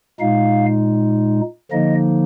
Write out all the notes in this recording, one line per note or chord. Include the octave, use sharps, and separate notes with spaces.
A#2 G#3 D#4 F5
D3 F3 A#3 D#4 D#5